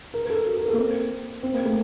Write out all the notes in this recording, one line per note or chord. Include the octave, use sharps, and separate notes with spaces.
A#4
A#4
A4
F#4
A#4
A4
A#3
C4
C4
A#3
A3